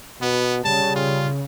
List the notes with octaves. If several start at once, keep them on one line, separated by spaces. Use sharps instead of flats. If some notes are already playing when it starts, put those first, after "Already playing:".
B2 B3
C#3 G3 A5
F4